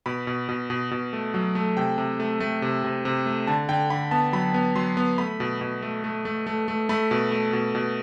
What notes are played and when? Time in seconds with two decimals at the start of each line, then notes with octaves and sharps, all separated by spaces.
0.06 B2 B5
0.27 B2
0.49 B2
0.70 B2
0.91 B2
1.13 A3
1.34 F#3
1.55 A3
1.77 C3 G5
1.98 C3
2.20 A3
2.40 A3
2.62 C3
2.84 C3
3.05 C3
3.26 A3
3.47 D3 A5
3.69 D3 G5
3.90 D3 B5
4.11 B3 A5
4.33 F#3 B5
4.54 B3
4.75 F#3 C6
4.97 B3
5.18 A3 B5
5.40 B2
5.61 B2
5.82 A3
6.04 A3
6.25 A3
6.47 A3
6.68 A3
6.89 A3 B5
7.11 B2
7.32 A3
7.53 B2
7.75 B2